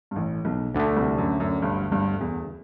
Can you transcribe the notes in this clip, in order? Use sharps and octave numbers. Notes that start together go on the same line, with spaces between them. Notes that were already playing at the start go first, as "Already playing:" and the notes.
G2
A1 A2
B1 B2
D2 D3 A3
C2 C3
F#2
F#2
G1 G2
G1 G2
E2